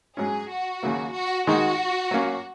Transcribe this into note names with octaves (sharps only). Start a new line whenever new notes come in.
G#2 F#3 C#4 G#4
F#4
D#2 C#3 F#3 A#3
F#4
D#3 G#3 D#4 F#4
F#3 A#3 C#4